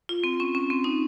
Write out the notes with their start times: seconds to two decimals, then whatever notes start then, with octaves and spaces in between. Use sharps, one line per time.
0.09 F4
0.24 C4
0.40 C#4
0.55 C#4
0.70 C4
0.84 D#4